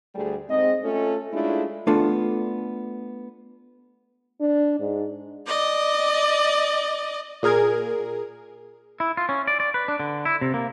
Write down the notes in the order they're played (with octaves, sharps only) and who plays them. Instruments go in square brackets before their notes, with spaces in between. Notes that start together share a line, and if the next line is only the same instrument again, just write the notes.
[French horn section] D2 G3 A3 G4 G#4
G#2 C4 D#5
A3 C#4 F4 A4
G#3 A3 C#4 D4 E4 F4
[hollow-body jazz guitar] A3 B3 D4 F4 A4
[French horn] D4
G#2
[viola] D5 D#5
[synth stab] A#2 G#4 A#4 G#6
[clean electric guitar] E4
F4
C#4
D5
D5
B4
D4
D3
E4
C3
A#3